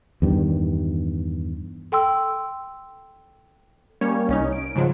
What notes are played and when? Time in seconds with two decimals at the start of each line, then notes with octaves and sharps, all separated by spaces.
0.22 E2 G2 D#3
1.92 A4 G5 C6 E6
4.01 G3 A#3 C#4 C#5
4.29 C2 C#4 D#4
4.53 D7
4.75 G#2 C#3 F3 F#3